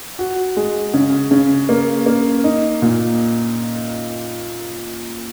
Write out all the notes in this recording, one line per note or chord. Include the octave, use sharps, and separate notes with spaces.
F#4
G#3
C#3
C#3
A#3
A#3
D#4
A#2